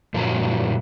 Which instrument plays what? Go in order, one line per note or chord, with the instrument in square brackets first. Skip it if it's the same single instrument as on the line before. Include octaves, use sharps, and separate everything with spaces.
[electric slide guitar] F#2 A#2 F3 F#3 A#5